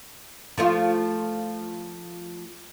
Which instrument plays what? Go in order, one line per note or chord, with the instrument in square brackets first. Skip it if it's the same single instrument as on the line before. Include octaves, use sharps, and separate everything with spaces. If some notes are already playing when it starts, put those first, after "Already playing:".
[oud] F3 A3 F4